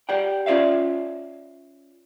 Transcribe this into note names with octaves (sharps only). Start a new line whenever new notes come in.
G4 D5 F#5 G5
C#4 F4 D5 E5 F5